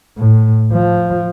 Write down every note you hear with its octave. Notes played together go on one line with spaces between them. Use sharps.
A2
F3